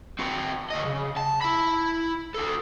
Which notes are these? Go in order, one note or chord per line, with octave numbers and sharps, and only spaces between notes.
C4 F#4
D2 D#5
C#3
A5
E4 B5
F#4 A4